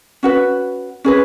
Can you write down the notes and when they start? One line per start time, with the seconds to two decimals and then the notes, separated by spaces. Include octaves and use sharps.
0.23 C#4 F#4 B4
1.04 C#4 G#4 B4